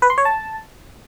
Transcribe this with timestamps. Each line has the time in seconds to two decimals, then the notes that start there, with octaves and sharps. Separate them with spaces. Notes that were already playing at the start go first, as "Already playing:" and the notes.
0.02 B4
0.10 C6
0.18 C#5
0.25 A5